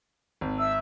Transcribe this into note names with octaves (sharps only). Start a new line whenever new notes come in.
G#1
E5 E6